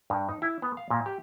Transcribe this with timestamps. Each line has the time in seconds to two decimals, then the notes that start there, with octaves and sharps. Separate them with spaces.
0.10 G2
0.29 D#4
0.42 E4
0.62 B3
0.77 F5
0.90 A#2
1.06 G4